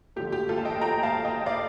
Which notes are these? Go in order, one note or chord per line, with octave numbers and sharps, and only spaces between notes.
D3 F3 A3 G4
G4
F4 A4
A5
D#5 G5
A5
G5 A#5
F5 A5
D#5 G5
D5 F5